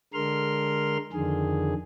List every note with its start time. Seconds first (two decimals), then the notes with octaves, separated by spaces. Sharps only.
0.13 D3 G#3 A#4 C6 F6
1.13 F2 D3 D#3 G#4